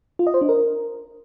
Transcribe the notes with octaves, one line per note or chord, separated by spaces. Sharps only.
F4
D#5
C5
D4
A#4